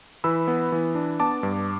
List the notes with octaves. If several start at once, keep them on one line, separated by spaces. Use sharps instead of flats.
E3 B5 E6
B3
E3
D4
B3 A5 D6
G2